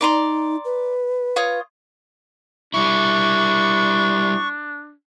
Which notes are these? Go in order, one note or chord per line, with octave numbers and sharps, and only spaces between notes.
D#4 D5 A#5 C6
B4
F4 C#5 D#6
G3 D4 E4 C#6